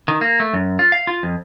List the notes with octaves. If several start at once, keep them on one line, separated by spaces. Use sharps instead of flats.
D#3
A#3
A3
F#2
F4
F5
F4
F2